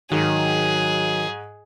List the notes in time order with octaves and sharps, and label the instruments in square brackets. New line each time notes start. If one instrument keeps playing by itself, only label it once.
[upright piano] G#2 [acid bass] D#3 [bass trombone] F#3 [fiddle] G#4